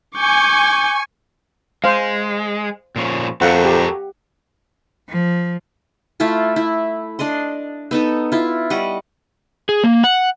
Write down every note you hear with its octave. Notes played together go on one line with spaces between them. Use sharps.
G#5 C#6 D6 G6
G#3 C5 F5
A#2 F3 C#4
F2 F#4 A4 A#4 F5 F#5
G4
F3
A3 E4 F4 A4
E4
D4 D5 D#5 C6
B3 D#4 A4
E4 F4
G3 D#5 F#5 C#6
G#4
A#3
F#5